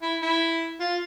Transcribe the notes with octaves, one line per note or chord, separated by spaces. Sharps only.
E4
E4
F4